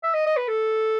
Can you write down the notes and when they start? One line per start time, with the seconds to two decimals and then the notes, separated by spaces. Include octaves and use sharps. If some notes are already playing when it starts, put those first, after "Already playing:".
0.03 E5
0.14 D#5
0.26 D#5
0.37 B4
0.48 A4